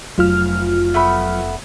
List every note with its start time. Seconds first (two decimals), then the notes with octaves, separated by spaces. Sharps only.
0.18 F1 F2 F#3 F4 F6
0.94 A3 B3 B5